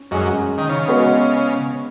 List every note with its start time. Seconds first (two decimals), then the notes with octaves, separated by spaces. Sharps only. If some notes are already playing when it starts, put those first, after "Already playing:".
Already playing: C#4
0.11 F#2 G#3 C#4 G#4 D#5
0.58 D#3
0.69 C#3
0.88 G#3 B3 F#4 B4 D#5